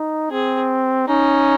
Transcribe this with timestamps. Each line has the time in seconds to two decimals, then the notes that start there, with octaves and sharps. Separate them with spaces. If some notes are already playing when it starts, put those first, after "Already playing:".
Already playing: D#4
0.31 C4 G#4
1.08 C#4 D#4